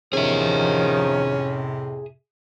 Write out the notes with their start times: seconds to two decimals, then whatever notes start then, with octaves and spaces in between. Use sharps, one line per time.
0.13 F2 A2 C3 D#3 F3 C#4 G#4 E5